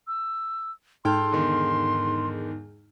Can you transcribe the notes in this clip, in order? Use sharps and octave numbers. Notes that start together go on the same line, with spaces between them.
E6
G#2 A4 G5 C6 F6
E2 D3 D#3